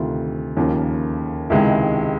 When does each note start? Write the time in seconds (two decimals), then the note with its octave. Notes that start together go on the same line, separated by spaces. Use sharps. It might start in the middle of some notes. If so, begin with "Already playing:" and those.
Already playing: D2 C3 D#3 F4
0.57 D#2 C#3 F3 A#3
1.50 C#2 C3 D#3 G#3 E4